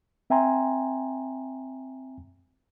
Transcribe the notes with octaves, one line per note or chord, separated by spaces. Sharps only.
C4 E5 G5 G#5 A#5 C6